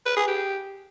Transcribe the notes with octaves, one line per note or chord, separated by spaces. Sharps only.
B4
G#4
G4